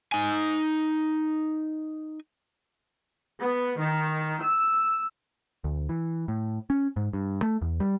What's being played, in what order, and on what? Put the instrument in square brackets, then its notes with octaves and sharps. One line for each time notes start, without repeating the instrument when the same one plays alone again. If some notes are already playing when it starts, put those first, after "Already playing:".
[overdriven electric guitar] D#4 G#5
[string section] B3
D#3
E6
[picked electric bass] D2
E3
A2
C#4
G#2
G2
A3
E2
G3